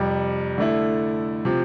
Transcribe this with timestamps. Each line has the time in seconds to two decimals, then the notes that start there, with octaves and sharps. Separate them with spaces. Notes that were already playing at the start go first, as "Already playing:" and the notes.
Already playing: F2 C3 G3
0.58 D3 A3 E4
1.45 C3 F3